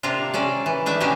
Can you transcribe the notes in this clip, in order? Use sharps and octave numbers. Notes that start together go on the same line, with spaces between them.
C3 A#3 D4 F4
A#3 C#4 A4 D5
E3
D#3 A3 D4 E5
B2 D#3 E3 A#3 C#4 G4